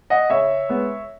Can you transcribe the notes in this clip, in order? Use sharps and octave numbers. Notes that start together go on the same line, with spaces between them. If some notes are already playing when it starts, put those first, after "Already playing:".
D#5 F#5
C#3 C#5 E5
G#3 B3